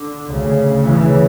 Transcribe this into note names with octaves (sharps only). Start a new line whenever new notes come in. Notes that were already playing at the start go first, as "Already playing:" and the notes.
Already playing: D3
D2 C#3
C#3 E3